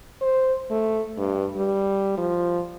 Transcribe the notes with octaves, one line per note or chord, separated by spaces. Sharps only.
C5
A3
G2
G3
F3